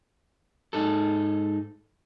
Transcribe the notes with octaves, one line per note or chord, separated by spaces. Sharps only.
G#2 D#4 G#4 A4